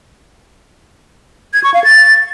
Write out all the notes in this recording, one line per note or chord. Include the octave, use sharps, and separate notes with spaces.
G#6
C#6
F5
A6